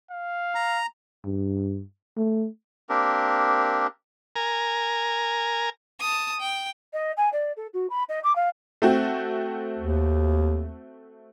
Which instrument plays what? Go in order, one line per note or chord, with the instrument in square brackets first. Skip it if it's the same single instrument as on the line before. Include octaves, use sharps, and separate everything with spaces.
[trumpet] F5
[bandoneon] A#5
[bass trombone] G2
A3
[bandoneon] A#3 C4 D4 G4 A#4
[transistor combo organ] A#4 G#5 A#5
[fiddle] A5 D#6
G5
[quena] D#5
G#5
D5
A4
F#4
B5
D#5
D6
F5
[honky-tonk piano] A3 C4 F#4
[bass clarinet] D#2